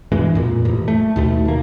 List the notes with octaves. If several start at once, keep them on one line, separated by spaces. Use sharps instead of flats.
G2 B2 E3 G#3
F2 A#2
A1 A#2
A3
D#2 B2 A3
D#2 A#3